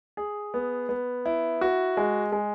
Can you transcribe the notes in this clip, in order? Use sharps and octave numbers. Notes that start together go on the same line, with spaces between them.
G#4
B3
B3
E4
F#4
G#3
G#3